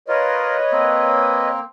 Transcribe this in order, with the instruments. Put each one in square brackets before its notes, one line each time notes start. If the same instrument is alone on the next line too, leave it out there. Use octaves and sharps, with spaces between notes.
[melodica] F4 A#4 [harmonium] B4 C#5 D#5
[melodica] A#3 C4